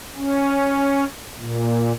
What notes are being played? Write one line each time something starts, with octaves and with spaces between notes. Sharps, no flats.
C#4
A#2